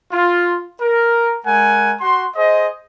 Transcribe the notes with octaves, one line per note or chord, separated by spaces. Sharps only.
F4
A#4
G#3 A#4 F#5 G#5
F#4 F#5 C6
G#4 C5 D#5